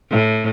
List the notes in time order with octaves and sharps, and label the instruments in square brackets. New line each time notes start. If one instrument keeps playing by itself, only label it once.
[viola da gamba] A2